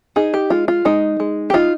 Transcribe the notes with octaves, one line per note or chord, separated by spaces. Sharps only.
D#4 G#4
G4
G#3 F4
F4
G#3 D#4
G#3
G4
D#4 F4